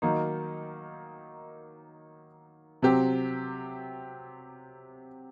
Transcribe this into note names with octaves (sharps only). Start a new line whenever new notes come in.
D#3 F#3 A#3 D#4
C3 F#3 C4 G4